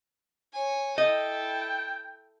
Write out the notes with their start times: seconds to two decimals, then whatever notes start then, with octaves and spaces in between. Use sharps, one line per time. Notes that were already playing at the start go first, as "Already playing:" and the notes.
0.54 C#5 G#5
0.98 E4 A4 D#5 G5